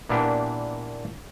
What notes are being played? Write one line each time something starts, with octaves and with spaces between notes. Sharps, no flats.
A#2 E3 A#3 B3 D4 G4